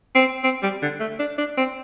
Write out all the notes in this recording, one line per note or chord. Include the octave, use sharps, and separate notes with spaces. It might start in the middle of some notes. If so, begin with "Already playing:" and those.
C4
C4
G3
D3
A3
D4
D4
C4